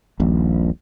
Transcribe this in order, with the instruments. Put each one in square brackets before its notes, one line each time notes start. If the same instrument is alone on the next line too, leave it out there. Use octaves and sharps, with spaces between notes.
[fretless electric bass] D#1 A#1